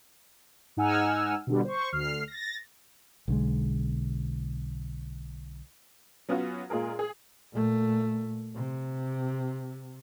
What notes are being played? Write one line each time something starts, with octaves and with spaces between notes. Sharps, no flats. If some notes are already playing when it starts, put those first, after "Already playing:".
G#2 D#4 F#5 G#5 E6 F6
B2 D3 G3
C5 C#6
D2 F6 C7
A6 A#6
B1 D3 G#3
F#3 B3 C#4 F4 F#4
A#2 G#3 F4 G#4 A#4
G#4
A#2 A3
C3